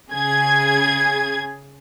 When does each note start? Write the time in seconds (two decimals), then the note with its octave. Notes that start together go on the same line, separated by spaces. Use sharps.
0.11 C#3 G#4 G#6